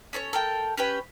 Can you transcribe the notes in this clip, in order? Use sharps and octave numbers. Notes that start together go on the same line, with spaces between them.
C#4 A4 C5 C#5
A4 A#4 G5
C#4 G4 B4 G5